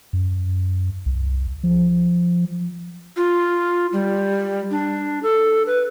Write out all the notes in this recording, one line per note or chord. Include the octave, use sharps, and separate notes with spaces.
F#2
C2
F3
F4
G3
D4
A4
B4